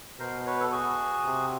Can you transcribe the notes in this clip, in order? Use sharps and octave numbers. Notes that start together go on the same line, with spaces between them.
B2 A#4 C5
B4 C#5
A4
F#4 G#4
C3